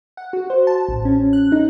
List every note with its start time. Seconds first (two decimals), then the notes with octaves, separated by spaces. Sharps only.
0.17 F#5
0.33 F#4
0.50 C5
0.67 A5
0.88 A1
1.05 C#4
1.33 F#6
1.52 D#4